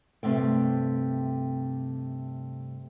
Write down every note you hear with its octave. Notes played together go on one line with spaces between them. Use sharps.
G2 C3 A3 G5